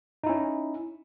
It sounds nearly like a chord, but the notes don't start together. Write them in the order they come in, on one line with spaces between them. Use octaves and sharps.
D#4 E4 C#4